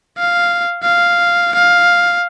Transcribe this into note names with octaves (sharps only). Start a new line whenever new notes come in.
F5
F5
F5